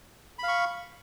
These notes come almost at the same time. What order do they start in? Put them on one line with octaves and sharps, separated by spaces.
B5 F5 C#6